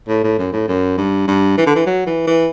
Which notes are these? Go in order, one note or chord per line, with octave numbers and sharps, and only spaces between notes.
A2
A2
F#2
A2
F#2
G2
G2
E3
D3
E3
F#3
E3
E3